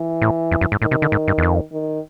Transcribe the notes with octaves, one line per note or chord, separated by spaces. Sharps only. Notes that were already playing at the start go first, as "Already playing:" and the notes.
Already playing: E3
A2
F2
F#2
G#2
A2 D#3
C3
D3
G#2
G2
E2
F2
D#3